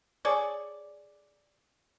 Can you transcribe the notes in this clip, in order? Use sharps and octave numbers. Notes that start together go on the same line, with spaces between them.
G#4 A4 C#5 D5